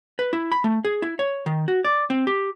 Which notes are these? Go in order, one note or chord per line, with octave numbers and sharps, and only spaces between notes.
B4
E4
B5
A3
G#4
E4
C#5
D#3
F#4
D5
C4
G4